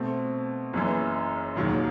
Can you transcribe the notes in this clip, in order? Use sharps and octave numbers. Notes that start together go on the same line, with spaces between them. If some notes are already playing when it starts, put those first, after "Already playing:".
Already playing: B2 A3 C4
F#1 F#2 E3
E1 D#2 D#3 F#3